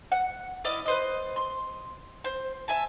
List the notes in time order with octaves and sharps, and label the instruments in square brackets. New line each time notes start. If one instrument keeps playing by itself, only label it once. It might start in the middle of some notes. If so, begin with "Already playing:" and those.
[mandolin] F#5
E4 D5 D#5 F5
B4 C5 D#5
C6
C5
E5 G#5 A5